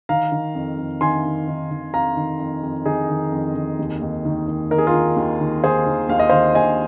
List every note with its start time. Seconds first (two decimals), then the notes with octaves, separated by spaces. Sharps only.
0.09 D#3 F5 A#5
0.32 D#3
0.55 F2
0.78 F2
1.01 D#3 G#5 C6
1.25 D#3
1.48 D#3
1.71 D#3
1.94 F2 F5 A#5
2.16 D#3
2.40 F2
2.63 F2
2.85 D#3 D#4 G#4
3.09 D#3
3.32 F2
3.55 D#3
3.79 D#2
4.01 D#2
4.25 D#3
4.48 D#3
4.71 D#3 A#4
4.78 G#4
4.87 F4 A#4
4.93 D#3
5.16 D#2
5.40 D#3
5.64 D#3 G#4 C5
5.86 D#3
6.09 D#2 F5
6.19 D#5
6.30 D#3 C5 F5
6.55 D#2 D#5 G#5